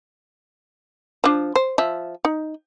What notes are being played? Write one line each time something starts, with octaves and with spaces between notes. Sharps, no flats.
F3 D4
C5
F3 E5
D#4